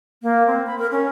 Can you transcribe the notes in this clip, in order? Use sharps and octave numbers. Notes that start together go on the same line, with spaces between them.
A#3
C4
B5
A#4
C#4